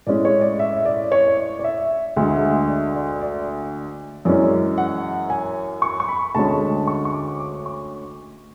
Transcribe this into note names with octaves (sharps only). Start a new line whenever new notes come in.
A2 G#3 C#4 D5
C#5
D5
E5
D5
C#5
D5
D5
E5
D2 D3 G#3 E5
D5
D5
D5
F#2 E3 G#3 C#4 D5
F#5
G#5
C#6
C#6
B5
D2 D3 G#3 C#4 A5
C#6
C#6
D6
D6
C#6